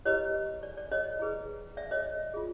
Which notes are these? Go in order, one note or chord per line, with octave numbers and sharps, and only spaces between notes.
E4 G4 B4 C#5 D#5
D5
D5
C#5 D#5
E4 G#4 B4
D5 E5
C#5 D#5
F4 G#4